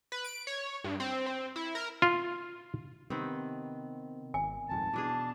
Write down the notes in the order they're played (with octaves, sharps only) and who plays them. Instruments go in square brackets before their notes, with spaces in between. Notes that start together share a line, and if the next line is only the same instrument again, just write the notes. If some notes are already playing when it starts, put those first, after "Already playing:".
[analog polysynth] B4
D7
C#5
G2
C4
C4
E4
A#4
[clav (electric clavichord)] F4
[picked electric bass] C3 [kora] D#3 B3 C4
[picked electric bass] G#1 [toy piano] G#5
[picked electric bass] D#1 F2 G#2 [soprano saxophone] A5
[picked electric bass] B2 [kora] E3 D4 G#4